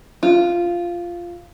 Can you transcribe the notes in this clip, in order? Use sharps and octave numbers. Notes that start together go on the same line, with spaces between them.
F4